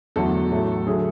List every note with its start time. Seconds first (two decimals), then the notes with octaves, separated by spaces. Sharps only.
0.16 E2 D3 F#3 A3 A4
0.51 A2 F#3 A3
0.87 D3 F#3 A3 G#4